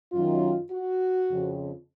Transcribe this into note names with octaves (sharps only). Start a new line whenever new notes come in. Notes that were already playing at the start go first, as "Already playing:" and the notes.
F#2 D#3 F4
F#4
F2 C#3